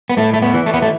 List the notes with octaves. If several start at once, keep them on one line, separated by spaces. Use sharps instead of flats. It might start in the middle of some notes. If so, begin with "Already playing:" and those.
B3
A2 A3
A3
B3
E3
A3
B3
A3